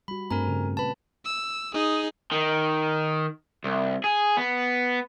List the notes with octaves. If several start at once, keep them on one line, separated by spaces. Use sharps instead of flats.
G3 F#4 B5
G2 A3 C4 G#4 A#4 G#5 A#5
C#3
A#2 B4 A5 B5
E6
D#4 G#4
D#3
C2
G#4
B3